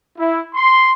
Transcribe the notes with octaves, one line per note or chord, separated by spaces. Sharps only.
E4
C6